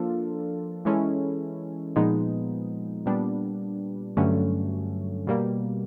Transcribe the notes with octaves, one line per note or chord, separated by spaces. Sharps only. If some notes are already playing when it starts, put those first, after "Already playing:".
Already playing: F3 A#3 D4 F4 A4
E3 G#3 C#4 E4 A4
A#2 F3 G#3 B3 D#4
A#2 G3 B3 D4
G2 D3 F#3 A3 C#4
B2 G3 A#3